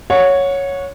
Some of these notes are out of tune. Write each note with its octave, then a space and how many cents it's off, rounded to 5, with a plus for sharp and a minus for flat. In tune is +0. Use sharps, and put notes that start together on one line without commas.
C#5 +0 F#5 -30